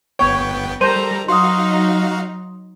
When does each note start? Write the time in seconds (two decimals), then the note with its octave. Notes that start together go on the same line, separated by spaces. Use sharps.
0.19 G1 B3 C#5 G5
0.81 G3 A4 A#4 C5 A#5 D#7
1.28 F#3 D#4 F#4 F5 C6 D#6